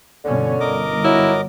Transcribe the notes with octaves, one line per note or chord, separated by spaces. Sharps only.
G1 B2 D3 C#4
G1 A#4 D#5 D6
F#3 E4